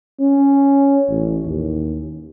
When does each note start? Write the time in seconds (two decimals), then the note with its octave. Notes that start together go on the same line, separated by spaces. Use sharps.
0.20 C#4
1.09 A1
1.45 D#2